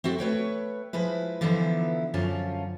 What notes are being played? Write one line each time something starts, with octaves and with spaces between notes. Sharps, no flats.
C4 E4 F#4 A4
A3 B4 C#5 G5
F3 G#3 E4 B4
D3 E3 F3 B3 D#4 E4
F#2 D3 F3 C#4 F4 A5